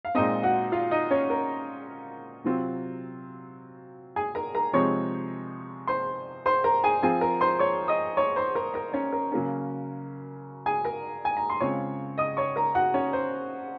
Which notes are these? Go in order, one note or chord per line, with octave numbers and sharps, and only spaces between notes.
F5
A#2 G#3 C4 D#4 D#5
F#4 F#5
F4 F5
D#4 D#5
C#4 C#5
A#4
C3 F#3 C4 F4
G#4 G#5
A#4 A#5
A#4 A#5
C3 F3 G#3 C4 D#4 C#5 C#6
C5 C6
C5 C6
A#4 A#5
G#4 G#5
F3 C4 F4 G#4 G#5
A#4 A#5
C5 C6
C#5 C#6
D#5 D#6
C#5 C#6
C5 C6
A#4 A#5
A#4 A#5
C#4 C#5
A#4
C#3 F#3 A#3 C#4
G#4 G#5
A#4 A#5
G#5
A#5
C6
C#3 G#3 C4 F4 C#5 C#6
D#5 D#6
C#5 C#6
A#4 A#5
F#4 F#5
C#4 C#5
C5